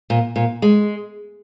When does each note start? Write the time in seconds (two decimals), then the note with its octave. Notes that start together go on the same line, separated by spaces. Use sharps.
0.10 A#2
0.36 A#2
0.62 G#3